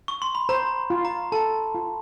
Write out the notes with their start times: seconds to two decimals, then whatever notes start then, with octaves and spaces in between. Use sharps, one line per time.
0.08 C#6
0.22 C6
0.35 B5
0.49 C5 A#5
0.90 F4
1.05 A#5
1.32 A4 A5
1.75 F4